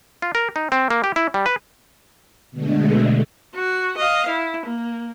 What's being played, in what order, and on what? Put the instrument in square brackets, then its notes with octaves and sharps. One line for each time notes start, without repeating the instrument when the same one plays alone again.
[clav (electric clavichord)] F4
A#4
D#4
C4
A#3
G4
E4
G3
B4
[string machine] B2 D3 G#3 A3
[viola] F#4
D#5 F5
E4
A#3